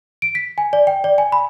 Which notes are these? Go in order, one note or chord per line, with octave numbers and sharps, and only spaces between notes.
D7
B6
G#5
D5
G5
D5
G#5
B5